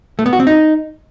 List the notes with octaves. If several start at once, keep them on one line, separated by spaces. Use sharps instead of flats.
A3
B3
F#4
C4
D#4